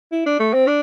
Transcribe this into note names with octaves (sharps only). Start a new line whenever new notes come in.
E4
D4
A3
C4
D4